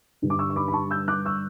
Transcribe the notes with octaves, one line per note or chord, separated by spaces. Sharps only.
G2 D3 G3
D6
C#6 E6
C#6
B5 D6
B5
A5 C#6
E6 G6
D6 F#6
C#6 E6